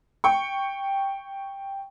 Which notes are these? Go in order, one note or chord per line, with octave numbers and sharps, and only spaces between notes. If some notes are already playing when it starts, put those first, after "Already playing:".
G5 C#6